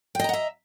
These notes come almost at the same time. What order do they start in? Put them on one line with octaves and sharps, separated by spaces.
G5 D#5 A#5 F#5 E5